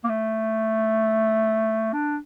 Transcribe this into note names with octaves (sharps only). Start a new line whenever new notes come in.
A#3
A3
D4